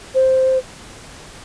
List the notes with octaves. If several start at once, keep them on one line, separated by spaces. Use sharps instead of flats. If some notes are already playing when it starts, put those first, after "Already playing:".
C5